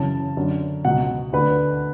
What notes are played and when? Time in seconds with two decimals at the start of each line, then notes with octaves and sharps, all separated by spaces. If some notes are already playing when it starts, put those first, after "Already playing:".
Already playing: F#2 C#3 E3 A5
0.37 F#2 D3
0.85 C#2 B2 F#5
1.33 D2 D3 B4